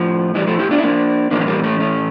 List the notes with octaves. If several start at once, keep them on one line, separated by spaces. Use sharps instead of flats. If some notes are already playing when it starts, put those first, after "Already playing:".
Already playing: A2 F3
E3 G3
F3 A3
E4 G4
D4 F4
E4
A#3 D4
A2 E3 A#3 D4
C#4
G3 A#3
A3 C#4
A3 C#4